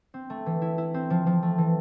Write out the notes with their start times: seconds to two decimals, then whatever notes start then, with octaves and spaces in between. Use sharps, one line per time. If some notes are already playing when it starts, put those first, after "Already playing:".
0.14 C4
0.30 A3
0.46 E3
0.62 E4
0.78 E4
0.94 C4
1.10 F3
1.26 F3
1.43 A3
1.58 E3